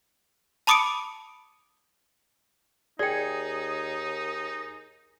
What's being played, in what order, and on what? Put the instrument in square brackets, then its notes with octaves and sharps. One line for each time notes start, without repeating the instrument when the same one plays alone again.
[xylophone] A5 B5 D6 D#6 C#7 D7
[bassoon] D#2 [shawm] D#4 [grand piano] G#4 [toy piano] D5 G5